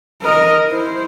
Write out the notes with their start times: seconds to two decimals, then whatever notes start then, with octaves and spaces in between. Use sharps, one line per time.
0.22 A#4 D#5
0.68 E4 C5